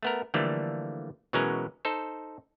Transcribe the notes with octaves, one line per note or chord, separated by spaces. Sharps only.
A3 B3 A#4
D3 E3 F3 G3 A3 A#3
B2 E3 F#3 G#3 C#4 A#4
D#4 A4 C5